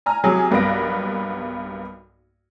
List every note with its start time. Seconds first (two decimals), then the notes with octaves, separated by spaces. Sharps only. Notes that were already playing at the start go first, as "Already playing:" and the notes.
0.06 G#5 A#5 F6
0.24 C3 F#3 G#4
0.51 B1 G2 A#3 B3 A#6 D7